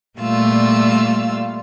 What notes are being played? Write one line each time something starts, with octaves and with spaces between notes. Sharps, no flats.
A#2 G3 A3 F4 E6